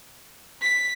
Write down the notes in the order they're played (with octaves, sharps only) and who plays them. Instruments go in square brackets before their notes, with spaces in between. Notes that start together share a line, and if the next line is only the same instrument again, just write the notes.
[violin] B6